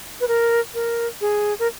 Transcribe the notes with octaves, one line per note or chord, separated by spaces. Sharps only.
B4
A#4
A#4
G#4
A#4